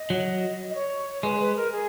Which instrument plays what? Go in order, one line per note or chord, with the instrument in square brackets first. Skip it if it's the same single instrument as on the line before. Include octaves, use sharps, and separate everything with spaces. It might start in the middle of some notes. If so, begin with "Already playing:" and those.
Already playing: [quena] D#5
[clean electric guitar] F#3
[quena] D#5
C#5
[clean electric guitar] G#3 [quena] B4
[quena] B4
A#4
G#4